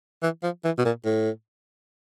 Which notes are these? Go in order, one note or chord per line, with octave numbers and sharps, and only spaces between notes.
E3
F3
E3
B2
A#2
A2